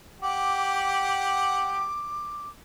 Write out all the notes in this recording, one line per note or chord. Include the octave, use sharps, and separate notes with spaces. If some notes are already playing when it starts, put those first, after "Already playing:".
G4 F#5 D6